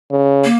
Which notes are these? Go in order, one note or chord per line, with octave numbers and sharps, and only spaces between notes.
C#3
A#3